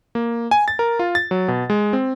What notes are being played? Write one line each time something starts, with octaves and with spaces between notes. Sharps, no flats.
A#3
G#5
A6
A#4
F4
A6
F#3
B2
G#3
C4